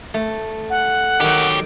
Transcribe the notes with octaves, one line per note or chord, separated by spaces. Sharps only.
A3
F#5
D#3 F#3 G4